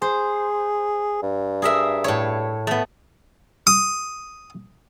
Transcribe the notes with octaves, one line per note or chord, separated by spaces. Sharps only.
G#4 C5
G2
G#4 A#4 E5
A2 C#5
A3 B3
D#6